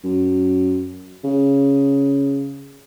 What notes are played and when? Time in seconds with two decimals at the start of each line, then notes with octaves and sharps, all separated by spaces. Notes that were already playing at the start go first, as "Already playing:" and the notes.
0.04 F#2
1.24 C#3